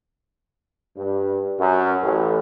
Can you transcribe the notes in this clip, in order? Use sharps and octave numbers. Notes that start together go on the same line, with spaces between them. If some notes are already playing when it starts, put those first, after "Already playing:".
G2
F#2
A1